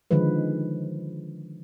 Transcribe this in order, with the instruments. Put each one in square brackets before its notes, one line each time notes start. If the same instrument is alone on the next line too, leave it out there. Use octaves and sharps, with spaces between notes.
[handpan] D3 D#3 F3 G#3 B4